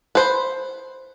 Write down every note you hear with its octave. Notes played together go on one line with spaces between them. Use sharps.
B4 C5